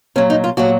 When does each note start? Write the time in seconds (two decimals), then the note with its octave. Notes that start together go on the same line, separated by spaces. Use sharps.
0.16 A#2 F#3 C#4
0.30 D#4
0.44 F4
0.57 A#2 F#3 F#4